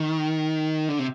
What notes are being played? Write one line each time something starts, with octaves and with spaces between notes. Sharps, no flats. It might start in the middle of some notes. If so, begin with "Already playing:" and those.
Already playing: D#3
D3
C3